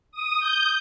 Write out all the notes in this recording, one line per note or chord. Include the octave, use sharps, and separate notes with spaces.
D#6
G6